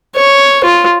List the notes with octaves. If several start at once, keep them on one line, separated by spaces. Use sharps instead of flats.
C#5
F4